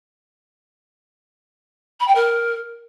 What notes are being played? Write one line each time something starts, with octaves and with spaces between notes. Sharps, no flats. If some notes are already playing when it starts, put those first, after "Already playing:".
B5
G5
A#4